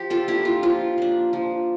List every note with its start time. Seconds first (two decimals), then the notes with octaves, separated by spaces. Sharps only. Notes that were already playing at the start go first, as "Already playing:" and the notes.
Already playing: F3 G4
0.10 F4 A4
0.28 A#3 D4 E4 G4
0.45 F4
0.63 F3 F4
0.98 A#3 D4
1.33 F3